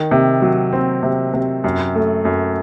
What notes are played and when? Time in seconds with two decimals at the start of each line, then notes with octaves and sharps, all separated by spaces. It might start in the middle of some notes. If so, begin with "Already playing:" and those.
Already playing: D#3
0.11 C3
0.42 F#3
0.73 C4
1.03 C3
1.34 C3
1.64 F#2
1.95 A3
2.25 F#2